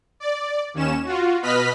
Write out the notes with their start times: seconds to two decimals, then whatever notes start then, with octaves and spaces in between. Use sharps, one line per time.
0.20 D5
0.74 D#2 C#4 E7
1.05 F4 F#4
1.42 B2 B4 D#5 B5 F6 B6